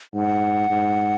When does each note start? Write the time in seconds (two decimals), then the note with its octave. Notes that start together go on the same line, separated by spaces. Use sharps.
0.14 G#2 F#5
0.70 G#2